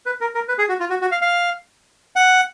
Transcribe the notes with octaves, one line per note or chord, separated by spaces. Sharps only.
B4
A#4
A#4
B4
G#4
F#4
F4
F#4
F#4
F5
F5
F#5